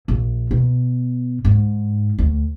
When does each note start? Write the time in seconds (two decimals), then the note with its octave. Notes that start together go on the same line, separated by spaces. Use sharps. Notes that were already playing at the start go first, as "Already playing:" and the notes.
0.08 A#1
0.51 B2
1.45 G#2
2.18 D2